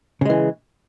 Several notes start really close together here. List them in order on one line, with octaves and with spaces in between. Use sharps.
C#3 G#3 E3